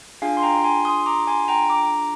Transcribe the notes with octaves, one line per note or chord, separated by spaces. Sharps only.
D4 F4 G#4 F5 G#5
C6
G5 A#5
G#5 C6
C6 D#6
A#5 D6
G#5 C6
G5 A#5
A#5 D6